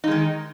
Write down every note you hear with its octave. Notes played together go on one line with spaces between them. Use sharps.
D#3 G#3 D#4